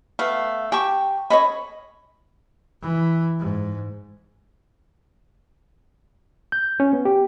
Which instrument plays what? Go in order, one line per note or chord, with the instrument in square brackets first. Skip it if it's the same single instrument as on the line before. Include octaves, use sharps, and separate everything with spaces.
[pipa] A3 B3 [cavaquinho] F5
[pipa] G4 [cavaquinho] G5 A5 C#6
[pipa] C#4 A4 C#5 [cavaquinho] D#5 B5
[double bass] E3
G#2
[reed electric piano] G6
C#4
B3
G4